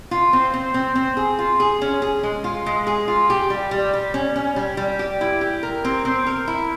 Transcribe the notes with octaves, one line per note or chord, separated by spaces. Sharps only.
F4
C4
C4
C4
C4
G#4
F4
G#4
C#4
G#4
G#3
F4
G#3
G#4
F4
G4
G3
G3
G3
C#4
C#4
G3
G3
G4
E4
G4
A#4
C4
C4
A#4
E4